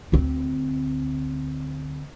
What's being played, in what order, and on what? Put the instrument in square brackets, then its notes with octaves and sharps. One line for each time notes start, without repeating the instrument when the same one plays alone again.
[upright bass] D2 C4